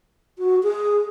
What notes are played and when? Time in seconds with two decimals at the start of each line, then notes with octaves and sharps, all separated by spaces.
0.39 F#4
0.63 G#4